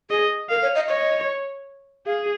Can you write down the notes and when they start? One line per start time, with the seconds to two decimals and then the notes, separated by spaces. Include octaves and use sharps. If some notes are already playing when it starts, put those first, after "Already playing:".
0.10 G#4 D#5
0.49 A#4 F5
0.62 C#5
0.75 D#5
0.89 C#5 D#5
2.06 G#4 F5